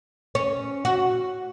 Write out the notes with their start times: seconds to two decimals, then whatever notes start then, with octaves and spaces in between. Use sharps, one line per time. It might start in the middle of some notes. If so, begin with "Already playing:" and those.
0.35 C#4
0.85 F#4